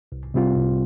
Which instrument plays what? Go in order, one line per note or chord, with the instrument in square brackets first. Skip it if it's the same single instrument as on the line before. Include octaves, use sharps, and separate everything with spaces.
[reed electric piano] C2
C3 G3 C4 F4
C2